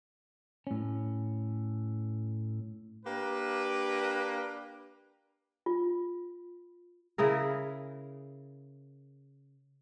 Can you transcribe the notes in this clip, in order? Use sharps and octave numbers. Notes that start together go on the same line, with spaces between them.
A2 C#4
A#3 D4 G4 B4
F4
C#3 E4 G#4 A#4